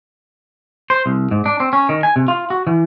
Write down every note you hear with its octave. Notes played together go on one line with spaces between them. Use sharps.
C5
C2
G#2
D4
C4
C#4
D#3
G#5
C3
F4
F#4
E3